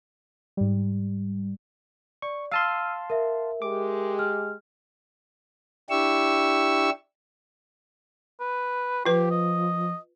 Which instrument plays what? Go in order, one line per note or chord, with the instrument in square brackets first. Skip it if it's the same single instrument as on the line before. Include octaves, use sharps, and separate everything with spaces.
[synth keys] G#2 G3
[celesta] D5 [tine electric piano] C#6
[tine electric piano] F5 A5 C6 [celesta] E6 F6 D#7
[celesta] A#4 E5
[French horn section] G#3 G4 [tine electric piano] D6
[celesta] F6
[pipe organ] D4 E4 G4 C#6 E6
[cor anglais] B4
[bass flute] F3 [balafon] F4 B4 [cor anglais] G4
[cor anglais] D#5